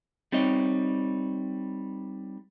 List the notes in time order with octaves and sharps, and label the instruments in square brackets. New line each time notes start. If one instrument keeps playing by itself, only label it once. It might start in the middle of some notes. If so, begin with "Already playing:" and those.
[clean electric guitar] G3 C4 D#4 C#5 D#5